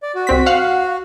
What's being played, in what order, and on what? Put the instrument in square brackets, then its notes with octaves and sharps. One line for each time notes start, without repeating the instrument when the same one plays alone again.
[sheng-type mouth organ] D5
F#4
[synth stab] C2 C4 B6
F5 F#5